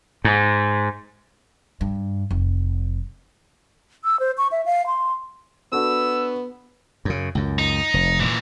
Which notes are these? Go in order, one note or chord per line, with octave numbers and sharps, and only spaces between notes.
G#2
G2
F1
E6
C5
C#6
E5
F5
C6
B3 D4 F#4 A4 E6
F#2 C#3
C#2 F#2
D#4
F1
A#2 E3